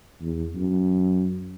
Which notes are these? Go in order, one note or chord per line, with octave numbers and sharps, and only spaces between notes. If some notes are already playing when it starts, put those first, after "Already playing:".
E2
F#2